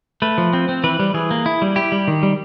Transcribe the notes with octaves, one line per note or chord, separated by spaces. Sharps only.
A3 B4
F3
C4
C4
E3 B4
G3
E3 G#4
A#3
E4
G3
E4 G4
G3
D#3
G3